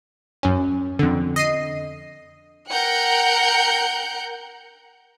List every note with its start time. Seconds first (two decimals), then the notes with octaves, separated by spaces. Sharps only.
0.43 F#2 C#4
0.99 F2 D3
1.36 D#5 C7 D#7
2.69 A#4 F#5 G5 F#6 G6 C#7